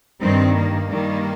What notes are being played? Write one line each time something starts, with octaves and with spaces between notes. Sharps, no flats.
G2 D#3 G3 C4
A#3
G2 D#3 G3